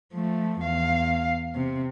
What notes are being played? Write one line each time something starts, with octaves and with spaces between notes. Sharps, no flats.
F3 A3
E2 F5
C3